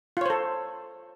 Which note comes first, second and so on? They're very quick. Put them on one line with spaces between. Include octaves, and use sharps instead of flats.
F4 C#5 C5 A4